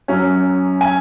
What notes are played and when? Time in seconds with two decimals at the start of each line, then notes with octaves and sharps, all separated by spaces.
0.08 F#2 F#3 C#4
0.81 G#5